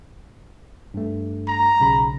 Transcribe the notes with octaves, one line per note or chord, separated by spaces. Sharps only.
G2 A3
A#5
B1 C#3 B5